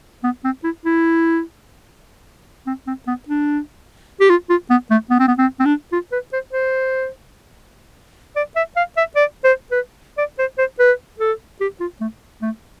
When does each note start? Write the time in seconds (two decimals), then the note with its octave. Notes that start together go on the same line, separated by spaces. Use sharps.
0.24 B3
0.44 C4
0.64 E4
0.85 E4
2.67 C4
2.87 C4
3.07 B3
3.29 D4
4.21 G4
4.30 F4
4.50 F4
4.70 B3
4.91 A3
5.10 B3
5.20 C4
5.28 B3
5.38 C4
5.60 C4
5.66 D4
5.92 F4
6.12 B4
6.33 C5
6.53 C5
8.36 D5
8.56 E5
8.77 F5
8.97 E5
9.16 D5
9.44 C5
9.71 B4
10.18 D5
10.39 C5
10.58 C5
10.80 B4
11.20 A4
11.61 G4
11.80 F4
12.01 A3
12.42 A3